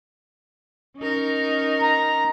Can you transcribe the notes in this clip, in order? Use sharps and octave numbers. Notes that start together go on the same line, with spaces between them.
C#4 D#4 A#4
A#5